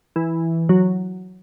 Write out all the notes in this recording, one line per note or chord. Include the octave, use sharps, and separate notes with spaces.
E3
F#3